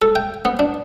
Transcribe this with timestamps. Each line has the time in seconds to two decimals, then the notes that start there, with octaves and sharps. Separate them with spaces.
0.02 A4
0.16 G5
0.45 B3
0.59 D4